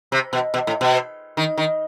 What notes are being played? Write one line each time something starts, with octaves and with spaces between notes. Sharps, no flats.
C3
B2
B2
A2
B2
D#3
D#3